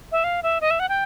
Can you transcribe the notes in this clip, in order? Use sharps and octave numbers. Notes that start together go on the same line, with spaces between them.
E5
F5
E5
D#5
E5
F#5
G5